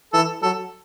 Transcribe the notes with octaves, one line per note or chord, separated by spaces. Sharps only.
E3 A4
F#3 A4